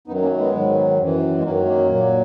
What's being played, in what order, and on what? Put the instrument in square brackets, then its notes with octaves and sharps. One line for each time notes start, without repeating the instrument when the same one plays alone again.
[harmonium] F#2 D#3 F#3 B3 D#4
A#3 C#4
G#3 B3
G#2 D#3 F#3
F#2 E3
G#3
F#2 D#3 F#3 A#3
A#3
A#2 F#3